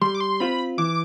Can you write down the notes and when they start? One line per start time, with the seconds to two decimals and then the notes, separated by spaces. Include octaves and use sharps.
0.01 G3 C6
0.15 D6
0.20 C6
0.40 C4 F4 C5 B5
0.78 E3 D6